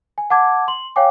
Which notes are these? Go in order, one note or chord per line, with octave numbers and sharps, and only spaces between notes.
G#5
F#5 A5 D6 G#6
C6 F#7
C#5 F5 G5 G#5 D6